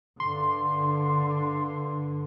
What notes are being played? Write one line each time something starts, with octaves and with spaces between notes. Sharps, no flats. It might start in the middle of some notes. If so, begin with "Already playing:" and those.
G2 D3 C6